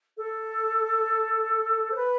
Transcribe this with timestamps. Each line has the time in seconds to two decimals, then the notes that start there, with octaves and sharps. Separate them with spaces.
0.17 A4
1.91 C5
1.96 B4